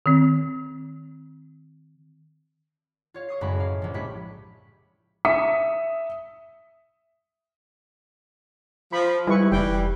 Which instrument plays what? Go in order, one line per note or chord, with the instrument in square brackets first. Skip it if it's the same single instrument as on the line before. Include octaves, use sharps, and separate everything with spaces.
[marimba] D#3 C4
[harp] F4 C#5 F5
C#6 D#6 C7
F#1 F#2 A2 G#3 B5 C#6
F5
A#1 F3
A2 G#3 G4 B5 C#6 B6
[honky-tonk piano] E5 D#6 B6 C#7
[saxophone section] F3 [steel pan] B5
[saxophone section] G#2 [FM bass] G3 [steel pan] E4 B4 C#6
[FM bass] F1 [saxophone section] E3 G3 [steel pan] G5